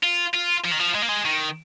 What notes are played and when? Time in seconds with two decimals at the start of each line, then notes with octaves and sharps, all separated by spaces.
0.03 F4
0.34 F4
0.64 F3
0.71 D#3
0.79 F3
0.95 G#3
1.02 A#3
1.08 G#3
1.25 D#3